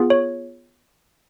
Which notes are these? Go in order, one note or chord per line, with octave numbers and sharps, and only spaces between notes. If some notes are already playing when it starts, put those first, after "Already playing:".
Already playing: B3 F4 G#4
C#5